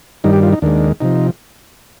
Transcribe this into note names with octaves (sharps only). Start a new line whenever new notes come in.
G2 D#3 G3 D#4
G4
F4
D#4
D#2 D#3 G#3 D4
C3 F3 D#4